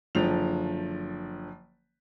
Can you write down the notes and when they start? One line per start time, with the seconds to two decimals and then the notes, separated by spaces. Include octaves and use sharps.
0.15 F#1 D3 F3 F7